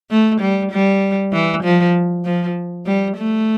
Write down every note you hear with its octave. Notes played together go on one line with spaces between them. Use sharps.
A3
G3
G3
E3
F3
F3
G3
A3